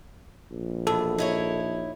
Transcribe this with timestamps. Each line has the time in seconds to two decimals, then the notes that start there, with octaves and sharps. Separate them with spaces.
0.51 A#1
0.87 E2 B2 A4
1.18 D#4 E4 C#5